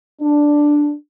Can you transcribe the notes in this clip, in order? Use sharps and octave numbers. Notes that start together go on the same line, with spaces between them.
D4